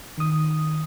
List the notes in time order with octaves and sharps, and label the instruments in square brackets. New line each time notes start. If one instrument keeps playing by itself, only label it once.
[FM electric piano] D#3 D#6